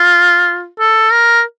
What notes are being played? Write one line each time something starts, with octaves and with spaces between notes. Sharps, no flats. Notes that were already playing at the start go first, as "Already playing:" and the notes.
Already playing: F4
A4
A#4